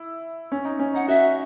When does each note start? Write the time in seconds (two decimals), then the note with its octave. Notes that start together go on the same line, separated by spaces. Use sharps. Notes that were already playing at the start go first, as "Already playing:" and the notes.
Already playing: E4
0.52 C#4
0.65 D#4
0.79 C#4
0.94 D#4 F#5
1.08 F#4 E5